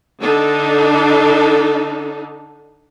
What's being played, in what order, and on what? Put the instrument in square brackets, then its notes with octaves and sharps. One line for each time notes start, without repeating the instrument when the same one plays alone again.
[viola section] D3 D4 D#4 A4